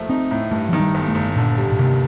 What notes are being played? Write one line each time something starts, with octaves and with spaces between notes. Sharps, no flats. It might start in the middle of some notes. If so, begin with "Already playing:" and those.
Already playing: D#2 F3 A3
C4 D#4
A2
G2 A3
D#3 F3
G3
G1
A3
G1
A#2 D3
G3
A#2
D#2 C3